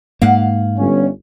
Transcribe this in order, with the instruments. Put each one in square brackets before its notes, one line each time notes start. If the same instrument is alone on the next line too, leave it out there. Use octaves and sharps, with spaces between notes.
[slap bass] G#2 A#3 [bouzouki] F5 F#5
[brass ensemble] G1 C#4